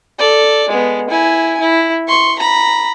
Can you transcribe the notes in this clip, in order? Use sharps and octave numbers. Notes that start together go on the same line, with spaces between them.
A4 D5
G#3 B3
E4 G#5
E4
C6 C#6
A#5 B5